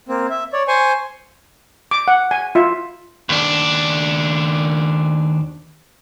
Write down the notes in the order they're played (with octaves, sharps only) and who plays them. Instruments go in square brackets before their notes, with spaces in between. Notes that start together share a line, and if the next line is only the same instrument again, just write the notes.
[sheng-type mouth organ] A#3 C4
E5
C#5 D5
C5 G#5 C6 C#6
[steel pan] D6
F#5
G#5
F4 E5
[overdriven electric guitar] D#2 D4